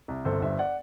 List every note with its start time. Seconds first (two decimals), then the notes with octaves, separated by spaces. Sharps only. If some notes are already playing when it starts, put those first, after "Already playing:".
0.08 C2
0.25 G1 A4 C5
0.42 G2 C5 E5
0.59 D5 F#5